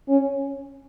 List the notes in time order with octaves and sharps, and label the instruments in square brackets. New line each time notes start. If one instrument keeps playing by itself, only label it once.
[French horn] C#4